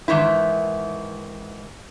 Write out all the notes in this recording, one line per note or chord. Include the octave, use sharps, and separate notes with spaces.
G#2 D#3 E3 E4